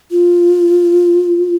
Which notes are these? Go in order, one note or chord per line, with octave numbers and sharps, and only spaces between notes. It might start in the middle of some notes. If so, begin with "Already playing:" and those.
F4